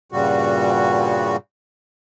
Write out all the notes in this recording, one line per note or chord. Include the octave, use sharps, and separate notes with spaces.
G2 A#2 C#3 G3 F#4